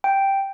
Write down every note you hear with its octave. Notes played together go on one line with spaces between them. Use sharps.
G5